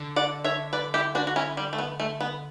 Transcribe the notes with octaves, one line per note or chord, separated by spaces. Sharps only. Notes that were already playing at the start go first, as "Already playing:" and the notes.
Already playing: D3
D5 F#5
C#5 E5
B4 D5
E4 G4
D4 F#4
F#4
C#4 E4
G3
A3
B3
A3
B3